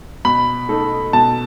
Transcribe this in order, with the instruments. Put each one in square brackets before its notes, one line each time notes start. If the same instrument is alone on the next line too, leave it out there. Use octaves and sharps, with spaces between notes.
[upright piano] B2 [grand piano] B5
[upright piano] A3 D#4 A4
[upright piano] B2 [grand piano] A5